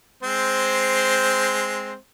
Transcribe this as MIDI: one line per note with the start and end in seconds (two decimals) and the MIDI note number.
0.23 1.96 56
0.23 1.96 60
0.23 1.96 72